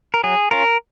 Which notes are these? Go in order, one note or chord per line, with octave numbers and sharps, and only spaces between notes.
A#4
F#3 G#4
C#4 F4 A#4